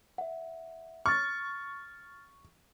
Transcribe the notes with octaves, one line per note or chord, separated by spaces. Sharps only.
E5 F#5
C#6 F6 A6